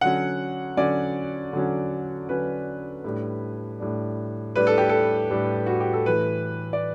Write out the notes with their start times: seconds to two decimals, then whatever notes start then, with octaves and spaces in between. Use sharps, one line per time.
0.01 D3 F#3 C#4 F#5
0.77 D3 F#3 C#4 D5
1.53 D3 F#3 C#4
2.29 D3 F#3 C#4 B4
3.04 A2 G3 D4
3.80 A2 G3 D4
4.56 A2 G3 D4 B4
4.67 A4
4.78 G4
4.89 A4
5.31 A2 G3 D4
5.66 F#4
5.80 G4
5.93 A4
6.06 A2 E3 A3 E4 B4
6.73 D5